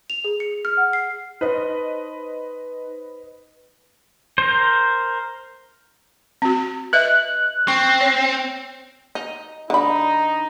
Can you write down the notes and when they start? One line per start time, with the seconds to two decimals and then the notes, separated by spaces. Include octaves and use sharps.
0.10 F7
0.24 G#4
0.40 C#7
0.65 F6
0.77 F#5
0.93 C7
1.41 D#4 B4 C5 D#5
4.38 A#4 C5
6.42 C4 F#4
6.93 B4 D#5 E5 F#6
7.68 C4 C#6
8.01 C#5
9.15 D#4
9.70 D3 D#4 B5